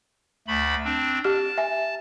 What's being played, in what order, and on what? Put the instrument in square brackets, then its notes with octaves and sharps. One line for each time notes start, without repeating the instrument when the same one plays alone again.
[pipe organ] D2 A3 B5
C4 D4
[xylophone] G4 F6 [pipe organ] A5
[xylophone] E5 G#5